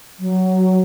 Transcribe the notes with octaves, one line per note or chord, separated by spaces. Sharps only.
F#3